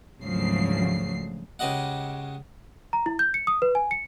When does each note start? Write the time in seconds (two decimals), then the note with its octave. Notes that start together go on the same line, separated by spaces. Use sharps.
0.21 G#1 D2 C#3 F3 F#3 C7
1.59 C#2 C#3 G4 D#5 F#5
2.93 A#5
3.06 E4
3.19 G6
3.34 C#7
3.47 D#6
3.62 B4
3.75 G#5
3.91 C#7